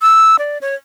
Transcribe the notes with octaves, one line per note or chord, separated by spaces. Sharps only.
E6
D5
C#5